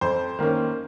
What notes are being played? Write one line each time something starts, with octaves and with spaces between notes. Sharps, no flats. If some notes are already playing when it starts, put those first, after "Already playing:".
F2 C5
D#3 A#3 C#4